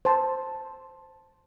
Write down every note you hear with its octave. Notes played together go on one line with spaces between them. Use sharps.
C5 A5